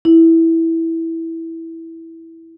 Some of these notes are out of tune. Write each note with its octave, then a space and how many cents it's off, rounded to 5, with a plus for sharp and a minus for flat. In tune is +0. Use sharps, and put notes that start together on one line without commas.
E4 -5